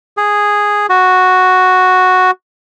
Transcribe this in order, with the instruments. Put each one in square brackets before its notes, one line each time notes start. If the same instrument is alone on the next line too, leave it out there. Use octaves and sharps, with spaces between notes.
[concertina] G#4
F#4